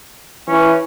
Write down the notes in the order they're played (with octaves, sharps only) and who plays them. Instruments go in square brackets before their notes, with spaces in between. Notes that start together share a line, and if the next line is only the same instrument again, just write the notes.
[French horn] E3 [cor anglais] C#4